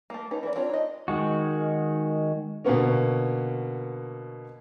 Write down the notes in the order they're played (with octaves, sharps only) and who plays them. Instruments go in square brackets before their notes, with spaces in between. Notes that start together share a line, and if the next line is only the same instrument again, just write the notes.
[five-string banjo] A3 A#3
C#4 D#4 B4
E3 A#4 D5
C4 D4 F4 C#5
D#4 D#5
[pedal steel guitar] D#3 G#3 F#4
[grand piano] B2 D3 A#3 B3 C#4